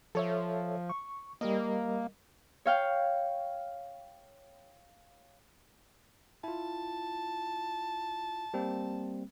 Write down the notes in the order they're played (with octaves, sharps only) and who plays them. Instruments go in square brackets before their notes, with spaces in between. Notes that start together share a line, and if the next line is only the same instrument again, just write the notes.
[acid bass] F3 [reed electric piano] A4 C#5 E5
[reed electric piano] C#6
[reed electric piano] G3 A#4 D#5 [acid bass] A#3
[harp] C#5 F5 G5
[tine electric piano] E4 F4 [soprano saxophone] A5
[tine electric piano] G3 A#3 C4